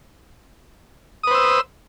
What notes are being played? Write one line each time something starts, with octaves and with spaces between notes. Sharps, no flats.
B4 C5 D#6 E6